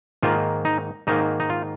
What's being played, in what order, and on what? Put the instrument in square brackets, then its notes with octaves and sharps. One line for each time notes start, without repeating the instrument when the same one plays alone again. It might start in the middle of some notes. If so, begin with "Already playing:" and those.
[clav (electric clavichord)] G#2 D#3 A#3 F4
D#4
G#2 D#3 A#3 D#4
D#4
F4